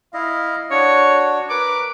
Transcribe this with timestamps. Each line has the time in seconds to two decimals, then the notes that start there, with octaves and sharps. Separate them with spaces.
0.14 E4 D#5 F5
0.71 D4 F#4 C#5
1.49 A#4 B4 D6